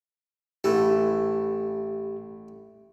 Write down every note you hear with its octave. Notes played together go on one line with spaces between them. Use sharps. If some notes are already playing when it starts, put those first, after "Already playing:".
A1 E3 A3 G4